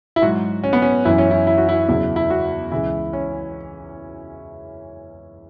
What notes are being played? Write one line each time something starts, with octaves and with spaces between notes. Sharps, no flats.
E4
G#2 F#3 F#4
C#4
B3
C#4
F#2 E3 E4
C#4
E4
E4
F#4
E4
E2 C#3 F#3 E4
E4
F#4
C#2 C#3 E3 E4
C#4